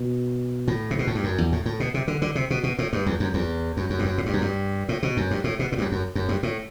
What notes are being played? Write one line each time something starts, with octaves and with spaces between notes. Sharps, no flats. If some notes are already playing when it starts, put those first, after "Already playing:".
Already playing: B2
A2
C3
B2
A2
G2
F#2
E2
A2
A2
B2
C3
D3
D3
C3
B2
B2
A2
G2
E2
F#2
E2
F#2
F#2
G2
F#2
A2
G2
F#2
G2
A2
B2
F#2
G2
A2
B2
A2
G2
F#2
F#2
F#2
G2
A2